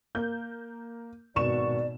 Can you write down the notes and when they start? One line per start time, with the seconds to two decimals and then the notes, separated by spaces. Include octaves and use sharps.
0.15 A#3 G6
1.36 G#1 B2 D5 C#6 E7